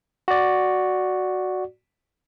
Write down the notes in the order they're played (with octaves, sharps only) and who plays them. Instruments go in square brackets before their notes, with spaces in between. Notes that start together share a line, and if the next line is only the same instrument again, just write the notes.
[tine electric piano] F#4 D5